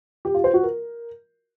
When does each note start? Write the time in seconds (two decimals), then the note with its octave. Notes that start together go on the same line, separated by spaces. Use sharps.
0.25 G4
0.34 F4
0.44 C5
0.54 F#4
0.63 A#4